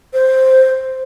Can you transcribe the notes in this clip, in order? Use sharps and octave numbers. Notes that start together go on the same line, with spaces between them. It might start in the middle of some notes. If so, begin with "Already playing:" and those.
C5